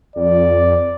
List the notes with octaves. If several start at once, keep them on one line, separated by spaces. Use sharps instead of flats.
F2 D5